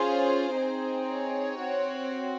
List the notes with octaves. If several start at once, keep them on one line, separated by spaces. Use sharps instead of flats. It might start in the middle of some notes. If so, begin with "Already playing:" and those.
Already playing: C#4 F4 G#4 C5
C4 D#4 G#4
C#5
C4 F#4